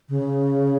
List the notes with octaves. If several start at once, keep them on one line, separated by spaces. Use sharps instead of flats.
C#3